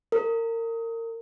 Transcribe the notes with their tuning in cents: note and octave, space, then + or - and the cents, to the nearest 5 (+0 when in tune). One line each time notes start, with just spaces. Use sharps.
A#4 -30